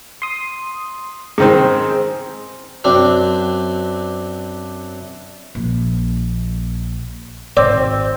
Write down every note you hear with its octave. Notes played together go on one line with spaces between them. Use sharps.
C6 D#6
G#2 D#3 C4 G#4 C5
F#2 C4 D4
A#1
G#1 C4 D5